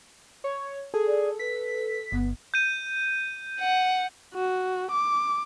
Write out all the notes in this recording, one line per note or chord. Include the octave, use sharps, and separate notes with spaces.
C#5
G#4 A4
D5
B4 B6
G1 B3
G6 D#7
F#5
F#4
D6